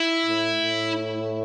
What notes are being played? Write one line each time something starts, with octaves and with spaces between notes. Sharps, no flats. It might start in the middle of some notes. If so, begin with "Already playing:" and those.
Already playing: E4
A2
A2